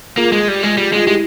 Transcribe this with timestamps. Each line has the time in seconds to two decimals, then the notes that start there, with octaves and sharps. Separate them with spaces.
0.17 A#3 F4 G#4
0.32 G#3
0.48 G3
0.63 G#3
0.77 G3
0.92 G#3 F4
1.06 G#3 E4 G4